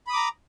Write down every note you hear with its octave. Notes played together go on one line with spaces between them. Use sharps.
A#5 B5 D6 D#6